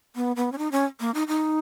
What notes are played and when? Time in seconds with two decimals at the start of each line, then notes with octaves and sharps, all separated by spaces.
0.16 B3
0.36 B3
0.52 C#4
0.58 D#4
0.72 C#4
1.00 A#3
1.14 D#4
1.28 D#4